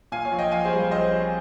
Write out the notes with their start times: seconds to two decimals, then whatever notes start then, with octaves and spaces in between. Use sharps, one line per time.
0.12 A#2 F5 G#5
0.25 C#5 F5
0.32 A#1
0.39 D#5 G5
0.51 A#1 F5 G#5
0.65 G#4 C5
0.72 G3
0.91 A#1 C5 D#5
1.11 C4